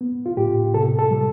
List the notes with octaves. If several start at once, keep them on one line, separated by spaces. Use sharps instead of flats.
B3
F4
A2 G4
C3 A4
A4
G3